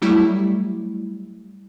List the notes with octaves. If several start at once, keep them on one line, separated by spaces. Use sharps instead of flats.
F#3 G3 A3 E4